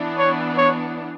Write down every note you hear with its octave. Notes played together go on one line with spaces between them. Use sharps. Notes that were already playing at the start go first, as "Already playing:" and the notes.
Already playing: E3 B3 D4
C#5
C#5